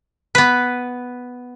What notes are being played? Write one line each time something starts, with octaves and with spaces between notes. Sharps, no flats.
B3 B4